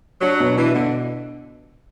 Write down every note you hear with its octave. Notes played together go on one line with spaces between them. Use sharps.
F#3 D4
B2
E3 D4
B2 D3